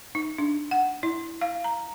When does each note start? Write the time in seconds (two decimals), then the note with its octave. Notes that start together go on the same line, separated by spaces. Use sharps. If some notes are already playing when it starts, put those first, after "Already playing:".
0.15 D#4
0.38 D4
0.71 F#5
1.03 E4
1.41 F5
1.64 A#5